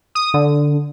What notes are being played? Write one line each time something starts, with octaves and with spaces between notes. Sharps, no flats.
D#6
D3